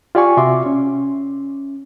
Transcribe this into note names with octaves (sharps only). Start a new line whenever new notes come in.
F4 G4 D5 F5 G#5 C#6
C3 F#4 E5 C6 D6
C#4